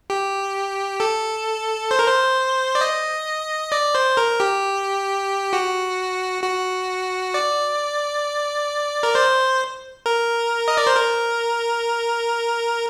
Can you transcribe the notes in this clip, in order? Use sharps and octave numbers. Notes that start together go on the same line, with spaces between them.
G4
A4
C5
A#4
C5
D5
D#5
D5
C5
A#4
G4
F#4
F#4
D5
A#4
C5
A#4
D#5
D5
C5
A#4